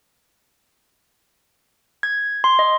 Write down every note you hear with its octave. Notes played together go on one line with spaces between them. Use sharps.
G#6
C6
D#5